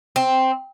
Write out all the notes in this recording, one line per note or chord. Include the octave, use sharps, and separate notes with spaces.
C4